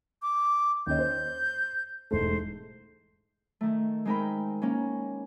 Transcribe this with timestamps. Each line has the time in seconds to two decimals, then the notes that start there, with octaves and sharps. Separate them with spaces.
0.22 D6
0.87 D#2 C#4 D#5 G6
0.99 C5
2.11 E1 G#2 A3 C5
3.61 D#3 A3
4.05 G#3 C4 D#4 A#4 G5 B5
4.62 A#3 C#4